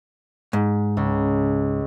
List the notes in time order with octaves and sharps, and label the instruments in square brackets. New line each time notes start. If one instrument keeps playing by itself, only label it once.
[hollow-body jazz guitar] G#2
[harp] C#2